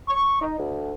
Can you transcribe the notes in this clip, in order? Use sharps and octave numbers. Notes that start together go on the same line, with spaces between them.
C#6
D#4
D2